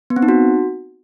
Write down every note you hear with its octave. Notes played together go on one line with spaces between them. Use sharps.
B3
C4
D#4
F#4